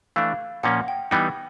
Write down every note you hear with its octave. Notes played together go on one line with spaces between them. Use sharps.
E3 A3 D4 F5
A#2 F3 A#3 C#4 F#5
G5
E3 G3 B3 D#4 G5